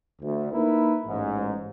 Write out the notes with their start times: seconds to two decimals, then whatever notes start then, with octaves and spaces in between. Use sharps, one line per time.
0.21 D2
0.52 A#3 D#4 E4 A#4 B4
1.07 A1 G#2